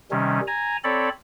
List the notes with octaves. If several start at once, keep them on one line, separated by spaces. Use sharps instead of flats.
C3 D#3 G3 C#4
G#5 A#5
C4 A4 C#5 D5 B5